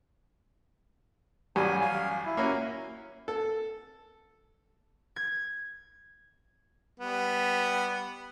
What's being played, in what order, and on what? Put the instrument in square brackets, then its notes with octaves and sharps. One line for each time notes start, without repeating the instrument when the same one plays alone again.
[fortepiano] A1 F#2 G3 [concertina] G#5
[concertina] F5 G#5
E4
[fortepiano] A#3 C#4 F#4
A4
[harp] G#6
[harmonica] G3 B3